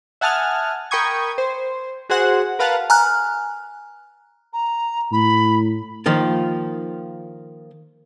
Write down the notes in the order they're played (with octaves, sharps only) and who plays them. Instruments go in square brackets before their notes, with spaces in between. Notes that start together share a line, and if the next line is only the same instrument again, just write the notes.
[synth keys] E5 F#5 G#5 A5 D#6 F6
A#4 G5 B5 C#6 D#6 G#6
C5
F#4 G#4 C5 F#5
A#4 B4 F5 F#5 A5
[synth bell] G#5 A#5 F6 F#6
[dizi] A#5
[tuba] A2 [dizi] B5
[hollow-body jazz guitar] D#3 F3 A#3 F4